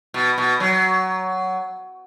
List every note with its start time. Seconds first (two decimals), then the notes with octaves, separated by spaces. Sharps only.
0.14 B2
0.38 B2
0.60 F#3